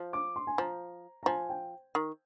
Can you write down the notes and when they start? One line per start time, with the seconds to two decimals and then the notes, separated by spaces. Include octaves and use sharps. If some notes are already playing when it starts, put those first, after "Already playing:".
Already playing: F3
0.13 D6
0.36 C6
0.47 G#5
0.58 F3 A#5
1.23 A#5
1.26 F3 G#5
1.49 G5
1.95 D#3